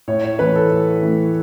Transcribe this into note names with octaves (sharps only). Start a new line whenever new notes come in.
A2 C#5
C#5
E3 A3 B4
A4
A2
E3 A3